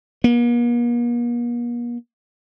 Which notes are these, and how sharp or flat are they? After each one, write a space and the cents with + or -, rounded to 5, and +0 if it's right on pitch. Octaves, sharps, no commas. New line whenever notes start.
A#3 +45